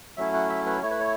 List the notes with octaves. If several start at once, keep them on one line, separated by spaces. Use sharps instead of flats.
F#3 A3 C#4 E4 E5
F#5
E5
B4
A3 E4 C#5
B4
C#5